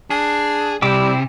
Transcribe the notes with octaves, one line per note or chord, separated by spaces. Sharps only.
D4 G#4
C3 G3 C4 E4 G5 D6